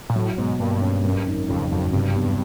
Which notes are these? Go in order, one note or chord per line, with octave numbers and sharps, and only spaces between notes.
A#2
A2 F#3
G#2 B2
G2 A#3
C#4
F#2
G#1
F2 C#3
F2 F#3
G2 C3
E2